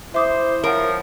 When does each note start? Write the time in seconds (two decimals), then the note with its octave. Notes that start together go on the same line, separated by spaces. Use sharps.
0.14 E4 C5 E5 D6 D#6
0.64 F3 A#4 C#5 F#5